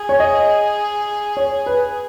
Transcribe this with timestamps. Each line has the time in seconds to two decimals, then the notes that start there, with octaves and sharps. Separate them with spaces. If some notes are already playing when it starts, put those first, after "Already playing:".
Already playing: G#4
0.09 C#5
0.20 D#5
1.37 C#5
1.66 B4